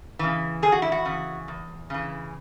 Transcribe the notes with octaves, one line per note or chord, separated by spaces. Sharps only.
C#3 E3
E2 G#4
F#4
E4
F#4
C#3 E3
E2
C#3 E3